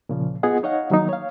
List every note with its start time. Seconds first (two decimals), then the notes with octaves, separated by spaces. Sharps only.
0.09 A#2 C#3 F3
0.43 B3 F4 G#4 D#5 F#5
0.63 D#4 C#5 D#5 F5 F#5
0.90 D#3 F#3 A#3 D#4
1.09 C#5 F5